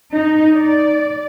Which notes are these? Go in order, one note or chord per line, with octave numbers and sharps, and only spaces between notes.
D#4
D5